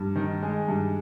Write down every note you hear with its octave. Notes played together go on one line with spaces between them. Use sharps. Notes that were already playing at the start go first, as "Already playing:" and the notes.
Already playing: G2
D#3
G#3
G2